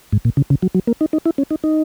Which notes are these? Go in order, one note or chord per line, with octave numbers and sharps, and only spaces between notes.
G#2
A#2
C#3
C#3
F#3
F#3
A#3
D#4
D#4
E4
C#4
D#4
D#4